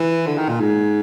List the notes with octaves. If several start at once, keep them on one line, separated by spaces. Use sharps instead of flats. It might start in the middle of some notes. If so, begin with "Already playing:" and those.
Already playing: E3
D3
D#3
A#2
G#2